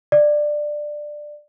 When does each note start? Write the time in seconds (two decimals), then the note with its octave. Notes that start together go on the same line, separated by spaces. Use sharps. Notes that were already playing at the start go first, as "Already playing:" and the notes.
0.12 D5